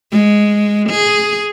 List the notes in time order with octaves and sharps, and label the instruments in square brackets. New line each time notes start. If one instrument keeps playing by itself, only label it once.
[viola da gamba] G#3
G#4